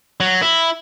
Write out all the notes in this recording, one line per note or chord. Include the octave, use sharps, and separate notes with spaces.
F#3
E4